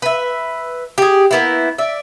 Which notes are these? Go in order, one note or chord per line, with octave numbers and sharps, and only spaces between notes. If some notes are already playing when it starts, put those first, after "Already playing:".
B4 E5
G4 G#4
A#3 B3 E4
D5 E5